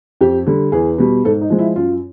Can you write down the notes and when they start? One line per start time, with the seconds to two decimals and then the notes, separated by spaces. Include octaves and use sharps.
0.21 F2 G4
0.47 D3 G3
0.72 E2 G#4
0.98 B2 G3
1.25 G#2 A4
1.41 D#4
1.50 F3 G#3
1.59 E4
1.76 F#2 F4